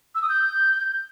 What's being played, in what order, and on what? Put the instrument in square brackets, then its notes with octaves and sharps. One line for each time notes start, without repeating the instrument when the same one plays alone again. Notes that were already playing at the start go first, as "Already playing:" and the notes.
[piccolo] E6
D#6
G6